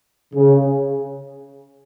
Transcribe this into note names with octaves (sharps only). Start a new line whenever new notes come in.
C#3